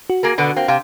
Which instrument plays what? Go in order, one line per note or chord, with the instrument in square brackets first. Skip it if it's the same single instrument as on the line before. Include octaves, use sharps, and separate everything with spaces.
[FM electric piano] F#4
[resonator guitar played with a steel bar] A#3 G#4 A#4
B2 D3 B3
A#3 C4
[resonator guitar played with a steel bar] C3 [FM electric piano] F5 G5